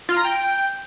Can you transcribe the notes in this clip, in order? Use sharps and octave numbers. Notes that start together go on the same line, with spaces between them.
F4
A#5
G5